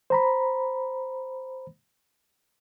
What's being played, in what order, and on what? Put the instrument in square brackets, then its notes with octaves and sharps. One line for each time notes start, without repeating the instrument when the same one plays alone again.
[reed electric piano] C5 A#5 B5